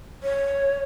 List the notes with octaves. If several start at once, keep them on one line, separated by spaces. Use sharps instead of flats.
C#5